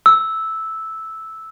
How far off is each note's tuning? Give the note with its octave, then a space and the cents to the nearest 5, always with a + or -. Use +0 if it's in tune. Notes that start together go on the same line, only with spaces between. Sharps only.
E6 -5